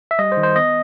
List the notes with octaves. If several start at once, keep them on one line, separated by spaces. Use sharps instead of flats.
E5
G3 D#5
C5
D#3
C5
B3 D#5